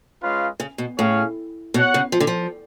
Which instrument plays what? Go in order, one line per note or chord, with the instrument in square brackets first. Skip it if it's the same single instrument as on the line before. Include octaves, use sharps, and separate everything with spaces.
[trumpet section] G#3 C#4 F4 B4 F5
[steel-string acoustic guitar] C#3
B2
[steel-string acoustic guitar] A2 [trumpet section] C#4 G#4 C#5 F5
[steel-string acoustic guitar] B2 [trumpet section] F#4 C#5 F#5
[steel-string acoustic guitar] C#3
F3
D3
F3